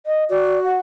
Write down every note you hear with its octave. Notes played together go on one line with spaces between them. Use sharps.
D#5
F#4 D5
F#5